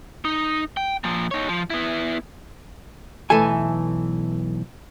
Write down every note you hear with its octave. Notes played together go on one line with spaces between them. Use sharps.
D#4
G5
A#2 F3
D#4 C#5
F3
B3 E4
B1 E3 A3 A4 G#5